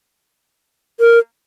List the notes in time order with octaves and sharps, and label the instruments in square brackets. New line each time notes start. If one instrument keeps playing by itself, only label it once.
[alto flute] A#4